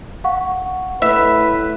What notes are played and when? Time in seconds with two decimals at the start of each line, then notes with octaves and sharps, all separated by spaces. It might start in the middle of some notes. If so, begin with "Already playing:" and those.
0.24 F5 F#5 C#6
1.02 A2 B4 E5